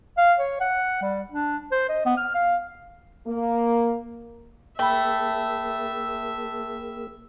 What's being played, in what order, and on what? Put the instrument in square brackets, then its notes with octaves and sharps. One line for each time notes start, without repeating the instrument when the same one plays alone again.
[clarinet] F5
C#5
F#5
G3
D4
C5
D#5
B3
F6
F5
[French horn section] A#3
[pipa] A3 [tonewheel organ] A#3 G#4 A#4 [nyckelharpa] E5 [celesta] G5 B5